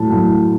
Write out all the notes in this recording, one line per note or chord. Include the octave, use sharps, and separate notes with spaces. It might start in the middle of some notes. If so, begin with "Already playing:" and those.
Already playing: A2 F#3 A5
A2